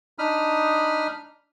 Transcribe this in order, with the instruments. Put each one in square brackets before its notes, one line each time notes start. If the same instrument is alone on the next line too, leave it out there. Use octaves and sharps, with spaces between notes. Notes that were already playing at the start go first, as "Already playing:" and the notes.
[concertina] D4 D#4 B5 D#6 F6